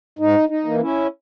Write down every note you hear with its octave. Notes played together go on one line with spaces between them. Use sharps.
G#2 D#4
D#4
E3 A#3
C#4 E4